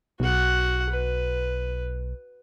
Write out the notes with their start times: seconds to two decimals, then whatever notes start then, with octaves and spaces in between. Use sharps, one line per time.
0.20 B1 F#4 F#5
0.89 B4